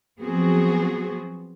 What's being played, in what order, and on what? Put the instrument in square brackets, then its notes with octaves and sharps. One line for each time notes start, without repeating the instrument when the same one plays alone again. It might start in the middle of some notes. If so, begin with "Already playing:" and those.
[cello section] F3 F#3 B3 C4 F#4 G#4